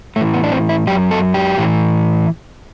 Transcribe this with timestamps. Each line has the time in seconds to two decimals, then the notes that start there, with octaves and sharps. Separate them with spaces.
0.16 A2 E3 A3
0.34 B3
0.44 D4
0.52 C4
0.69 E4
0.87 F#2 F#3 G4
1.11 A4
1.34 G4
1.58 A2 E3